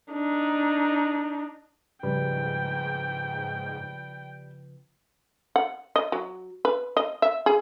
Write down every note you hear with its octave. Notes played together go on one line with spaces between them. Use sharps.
D4 D#4
G#2 C#3 F3 G3 B4 G5
F#5
D#5
F#3
B4
D#5
E5
G#4